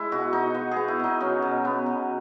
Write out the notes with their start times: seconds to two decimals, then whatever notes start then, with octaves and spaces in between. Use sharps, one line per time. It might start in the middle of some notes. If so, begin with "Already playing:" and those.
Already playing: G#3 E4
0.12 B2 F#4
0.33 B2 D#4
0.55 B3
0.71 G#4
0.76 B3
0.88 E4
0.99 B2 D#4
1.20 F#3 C#4
1.42 B2
1.65 B3
1.86 B2